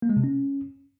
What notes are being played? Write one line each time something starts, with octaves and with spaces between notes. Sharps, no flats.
A#3
G#3
C3
C#4